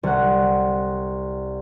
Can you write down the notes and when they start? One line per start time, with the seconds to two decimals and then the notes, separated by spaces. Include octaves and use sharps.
0.03 C2 F#5